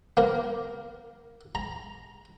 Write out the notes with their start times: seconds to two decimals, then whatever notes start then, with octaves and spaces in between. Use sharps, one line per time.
0.17 A#3 A#4
1.55 A#5